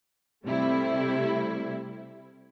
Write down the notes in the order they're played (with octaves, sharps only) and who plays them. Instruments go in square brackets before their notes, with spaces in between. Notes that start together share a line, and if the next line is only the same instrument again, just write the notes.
[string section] C3 G3 A3 E4